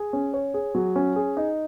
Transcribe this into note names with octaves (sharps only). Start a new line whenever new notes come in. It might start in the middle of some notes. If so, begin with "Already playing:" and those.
Already playing: G#4
C#4
C#5
G#4
F#3
C#4
G#4
D#4